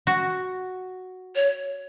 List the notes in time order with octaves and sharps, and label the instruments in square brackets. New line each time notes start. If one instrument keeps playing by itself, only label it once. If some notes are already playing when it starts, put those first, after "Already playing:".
[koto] F#4
[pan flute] C#5